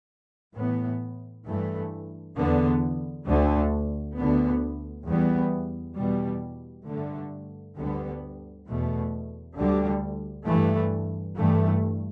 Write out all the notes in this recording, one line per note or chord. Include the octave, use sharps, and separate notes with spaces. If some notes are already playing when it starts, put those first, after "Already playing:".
A2 E3 B3
G2 E3 A3
E2 D3 B3
D2 D3 A3
D2 D3 B3
E2 E3 G3 B3
E2 B2 G3
G2 D3 A3
D2 D3 G3 B3
E2 B2 A3
D2 D3 G3
G2 E3 A3
G2 E3 A3